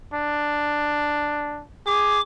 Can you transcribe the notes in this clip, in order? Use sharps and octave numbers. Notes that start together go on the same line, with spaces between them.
D4
G#4 D6